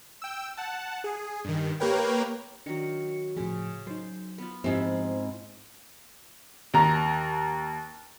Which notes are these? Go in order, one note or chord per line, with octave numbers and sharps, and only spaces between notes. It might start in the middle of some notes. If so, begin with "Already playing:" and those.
G5 E6
F#5 A5
G#4
G2 D#3
A#3 G4 A#4 B4 C#5 G5
D#3 F#3 D4 C#7
A2 C#3 F3 G#4
F#3 D#4 C5
B3 F4
G#2 F3 C4 E4 F4 G4
D#2 A#5